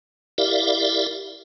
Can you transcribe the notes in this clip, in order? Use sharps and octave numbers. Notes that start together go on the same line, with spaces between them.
E4 G4 A#4 D5 E5 F5